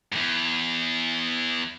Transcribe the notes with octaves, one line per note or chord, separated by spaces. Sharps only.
E2 G#2